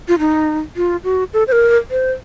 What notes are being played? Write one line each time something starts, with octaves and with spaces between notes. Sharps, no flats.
F4
D#4
F4
F#4
A4
C5
A#4
C5